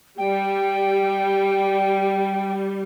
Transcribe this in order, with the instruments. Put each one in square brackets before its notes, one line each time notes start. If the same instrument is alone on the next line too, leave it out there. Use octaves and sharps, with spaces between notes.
[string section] G3 [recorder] G5